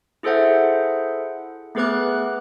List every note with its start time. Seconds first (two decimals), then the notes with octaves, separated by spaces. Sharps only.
0.23 E4 G#4 A4 C5 E5 F#5
1.75 A3 B3 G#4 B4 D6 F#6